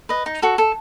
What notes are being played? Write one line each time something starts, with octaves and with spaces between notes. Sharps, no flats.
B4 D#5
D#4
F#4 A4
A4